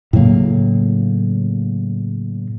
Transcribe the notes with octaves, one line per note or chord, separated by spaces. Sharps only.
A2 C#3 F#3 A#3